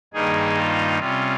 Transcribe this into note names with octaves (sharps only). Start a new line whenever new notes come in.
G2 D#3 A#3 D#4 G#4
F4
C3 G3 C#4 F4